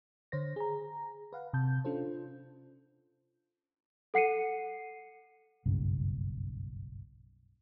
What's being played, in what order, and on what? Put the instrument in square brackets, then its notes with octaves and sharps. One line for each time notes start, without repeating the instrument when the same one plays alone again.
[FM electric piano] D3 C5 C#5 A#6
G#4 A#5
B4 F5 F#5
C3 A5 G6
C#4 D4 F4 A4 C5
[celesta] A4 F#5 C7 C#7 D#7
[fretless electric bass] F#1 B1 G2 C#3